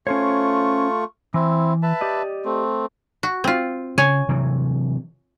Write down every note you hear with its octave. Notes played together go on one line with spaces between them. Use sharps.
A3 C#4 F4 C5 C#5 C#6
E3 C4 E4
B4 E5 A5
G4 D5 D#5
A3 C4
F#4
C4 F4
C#3 C#5 G#5
C3 E3 F#3